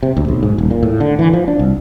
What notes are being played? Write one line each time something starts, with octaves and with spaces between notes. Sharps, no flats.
C3
D2
B1
G#2
D#1
A#2
A2
D3
E3
F3
D4
C2